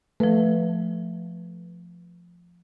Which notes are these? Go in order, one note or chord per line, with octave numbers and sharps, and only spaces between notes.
F3 A3 B4